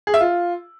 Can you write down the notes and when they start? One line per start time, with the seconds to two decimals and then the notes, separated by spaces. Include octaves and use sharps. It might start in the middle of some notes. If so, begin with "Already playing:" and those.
0.07 G#4
0.14 E5
0.20 F4